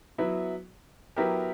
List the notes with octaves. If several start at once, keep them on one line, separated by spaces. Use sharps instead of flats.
F#3 B3 E4
F#3 B3 E4 G4 A#4